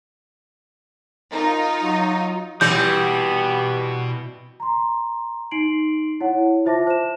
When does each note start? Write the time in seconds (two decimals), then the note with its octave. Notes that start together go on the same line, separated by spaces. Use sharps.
1.32 D#4 F4 A#4
1.83 F#3
2.61 B2 E3 G3 B3 C4 G4 G6
4.60 A#5 C6
5.51 D#4 C6 C7 D7 F#7
6.20 E4 C#5 F#5
6.65 F4 C5 E5 A5 D6 A#6
6.87 C5 E7